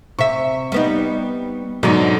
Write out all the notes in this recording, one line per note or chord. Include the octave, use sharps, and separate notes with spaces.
C3 E5 C#6
G3 B3 D#4
G#2 B2 D3 F#3 C#4 D#4